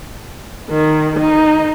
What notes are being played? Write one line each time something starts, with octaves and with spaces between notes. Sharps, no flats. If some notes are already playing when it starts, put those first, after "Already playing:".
D#3
D#4